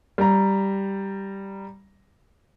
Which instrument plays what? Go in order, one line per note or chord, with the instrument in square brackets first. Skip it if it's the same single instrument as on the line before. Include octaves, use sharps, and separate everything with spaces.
[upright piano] G3 A#5